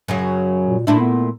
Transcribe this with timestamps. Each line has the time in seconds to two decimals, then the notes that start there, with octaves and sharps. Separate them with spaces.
0.08 F#2 C#3 F#3
0.66 A#2
0.87 A#2 A3 D4 E4
0.99 B3